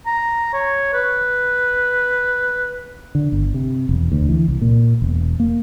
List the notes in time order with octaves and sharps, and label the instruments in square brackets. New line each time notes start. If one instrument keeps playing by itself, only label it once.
[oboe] A#5
C#5
B4
[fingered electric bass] D3
G1
C3
E1
D2
E3
C2
A#2
E1
A#3